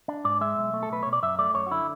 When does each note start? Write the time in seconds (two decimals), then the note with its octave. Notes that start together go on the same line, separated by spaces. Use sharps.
0.08 D4
0.25 G#2 D5
0.41 G#3 E5
0.57 B1
0.74 A3
0.83 A4
0.90 B1 B4
1.03 B2 C#5
1.13 D5
1.22 F#2 E5
1.39 A3 D5
1.55 F#2 C#5
1.67 F#4
1.71 D3 E4